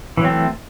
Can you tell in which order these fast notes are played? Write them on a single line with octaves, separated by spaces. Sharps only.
E3 F#3 C4 A3